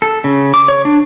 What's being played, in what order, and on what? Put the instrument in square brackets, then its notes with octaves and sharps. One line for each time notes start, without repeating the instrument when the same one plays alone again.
[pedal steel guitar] A4
C#3
D6
C#5
D4